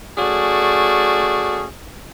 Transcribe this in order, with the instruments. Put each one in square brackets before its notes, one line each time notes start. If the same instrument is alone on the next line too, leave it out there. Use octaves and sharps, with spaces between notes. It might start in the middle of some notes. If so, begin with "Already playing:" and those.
[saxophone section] A3 C#4 F#4 G#4 D5